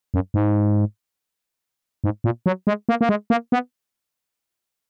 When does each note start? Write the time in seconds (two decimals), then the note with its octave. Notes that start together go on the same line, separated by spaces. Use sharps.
0.14 F#2
0.34 G#2
2.04 G#2
2.24 A#2
2.46 F#3
2.67 G#3
2.89 A#3
3.01 A#3
3.09 G#3
3.30 A#3
3.52 B3